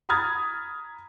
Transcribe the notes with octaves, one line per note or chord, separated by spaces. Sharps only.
A#5 B5 D#6 F6 G#6 A6